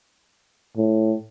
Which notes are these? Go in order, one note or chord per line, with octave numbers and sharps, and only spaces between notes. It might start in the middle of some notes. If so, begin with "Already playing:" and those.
A2